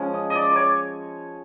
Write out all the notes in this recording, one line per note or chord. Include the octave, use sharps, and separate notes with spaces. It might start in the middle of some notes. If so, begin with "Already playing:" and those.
Already playing: F3 G#3 C#4
D#5
D#5
D5
C#5 D5